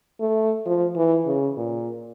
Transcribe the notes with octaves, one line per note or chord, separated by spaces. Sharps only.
A3
F3
E3
C#3
A#2